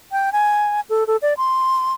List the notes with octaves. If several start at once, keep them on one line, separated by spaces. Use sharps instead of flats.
G5
G#5
A4
A4
D5
C6